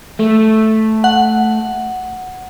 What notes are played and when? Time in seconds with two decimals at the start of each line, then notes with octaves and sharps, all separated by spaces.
0.20 A3
1.04 F#5